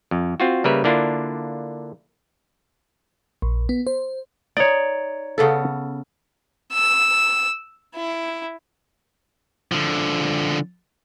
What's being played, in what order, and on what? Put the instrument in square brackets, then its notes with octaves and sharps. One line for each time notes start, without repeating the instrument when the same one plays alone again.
[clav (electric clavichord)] F2
C4 F4 F#4
C#3 G3 A#3 A#4 B4 E5
D3 A#3 D4 E4 F4
[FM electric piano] A#1
B3
C5
[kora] D#4 [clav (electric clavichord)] C#5 D5
[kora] C#3 B3 A4
[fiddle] E6
E4
[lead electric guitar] D3 F3